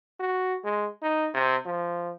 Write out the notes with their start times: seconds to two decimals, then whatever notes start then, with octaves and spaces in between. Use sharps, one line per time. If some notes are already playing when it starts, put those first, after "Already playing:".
0.20 F#4
0.64 G#3
1.03 D#4
1.34 C3
1.66 F3